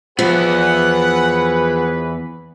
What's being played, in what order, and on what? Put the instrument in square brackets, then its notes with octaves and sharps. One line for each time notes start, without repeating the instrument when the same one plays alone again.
[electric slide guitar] E2 B3 [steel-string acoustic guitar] F3 [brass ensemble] G#4 B4 [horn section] F#5